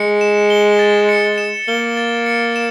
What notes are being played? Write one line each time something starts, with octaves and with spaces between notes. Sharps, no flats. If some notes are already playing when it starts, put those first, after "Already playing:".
Already playing: G#3 C#7
E7
G7
A6
C#7
E7
A#3 G7
A6
C#7
E7